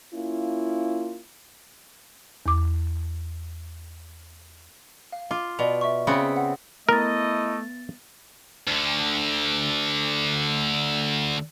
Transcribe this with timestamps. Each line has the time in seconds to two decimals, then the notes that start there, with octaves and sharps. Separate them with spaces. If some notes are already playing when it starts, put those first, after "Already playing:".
0.13 A#3 C#4 E4 F4
2.46 E2 D6
5.12 F5
5.31 F4 D6
5.59 B2 D5 F7
5.81 E5 C#6
6.07 C#3 B3 C4
6.37 F#5
6.89 A3 B3 E4 A#4 D#5 A6
8.68 D2 D3